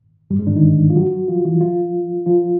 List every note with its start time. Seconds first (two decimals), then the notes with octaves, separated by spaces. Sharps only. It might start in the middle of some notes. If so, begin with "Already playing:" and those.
0.30 G2 G3
0.39 G#2 G#3
0.47 D3 D4
0.56 D#3 D#4
0.90 F4
0.96 F#3 F#4
1.28 F3 F4
1.45 E3 E4
1.61 F3 F4
2.26 F3 F4